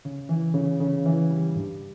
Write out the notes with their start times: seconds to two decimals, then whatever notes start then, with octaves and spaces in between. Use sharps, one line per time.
0.05 C#3
0.29 E3
0.54 C#3
0.80 C#3
1.06 E3
1.31 G3
1.56 G2